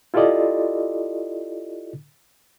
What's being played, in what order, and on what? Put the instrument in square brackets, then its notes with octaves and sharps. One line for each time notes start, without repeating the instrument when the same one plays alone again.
[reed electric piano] E4 F4 G4 A4 D5 D#5